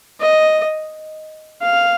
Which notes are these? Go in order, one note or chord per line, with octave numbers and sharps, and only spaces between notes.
D#5
F5